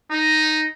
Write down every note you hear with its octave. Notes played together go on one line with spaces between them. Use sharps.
D#4